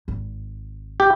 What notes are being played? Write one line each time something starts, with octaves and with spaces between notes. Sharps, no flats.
G#1
G4